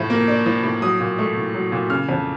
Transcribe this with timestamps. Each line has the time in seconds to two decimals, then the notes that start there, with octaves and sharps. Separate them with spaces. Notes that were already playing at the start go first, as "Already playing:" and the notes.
Already playing: A2 F3
0.10 A#3
0.28 D4
0.46 F3
0.63 A2
0.81 F#3 D#6
1.00 A#2
1.19 A3
1.36 A#2
1.54 F#3
1.72 A#2
1.90 C#3 F6
2.09 F2